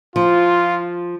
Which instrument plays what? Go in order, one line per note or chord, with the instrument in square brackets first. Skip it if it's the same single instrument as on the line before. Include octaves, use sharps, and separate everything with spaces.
[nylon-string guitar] F3 [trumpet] F4